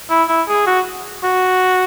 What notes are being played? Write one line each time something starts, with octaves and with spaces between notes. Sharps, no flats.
E4
E4
G#4
F#4
F#4